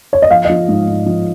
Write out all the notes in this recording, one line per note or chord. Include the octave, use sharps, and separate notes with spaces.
C#5
D#5
F3 F5
D#5
F3
G#2
G#2
F3